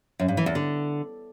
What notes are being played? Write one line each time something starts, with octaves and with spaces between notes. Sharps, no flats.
F#2
G2
E3
E2
D3